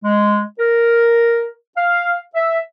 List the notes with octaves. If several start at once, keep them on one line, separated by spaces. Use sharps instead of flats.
G#3
A#4
F5
E5